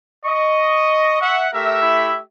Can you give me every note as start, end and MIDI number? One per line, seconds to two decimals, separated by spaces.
0.25 1.16 75
0.25 1.41 85
1.20 1.48 76
1.20 1.48 78
1.53 2.20 57
1.53 2.20 67
1.53 1.78 70
1.53 2.20 76
1.82 2.12 64